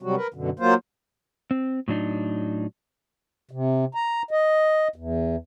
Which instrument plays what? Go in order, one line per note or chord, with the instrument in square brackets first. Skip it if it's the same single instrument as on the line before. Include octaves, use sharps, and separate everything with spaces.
[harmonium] C3 F#3 G3 F#4
A#4 B4
F#2 B2 D3
F#3 A#3 F4 C5
[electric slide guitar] C4
A2 F#3 D4 D#4
[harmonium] C3
A#5
D#5
E2